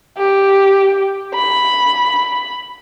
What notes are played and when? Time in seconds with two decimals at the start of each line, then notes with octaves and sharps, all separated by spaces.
0.18 G4
1.35 B5